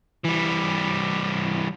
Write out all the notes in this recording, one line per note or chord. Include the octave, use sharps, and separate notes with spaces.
E3 G3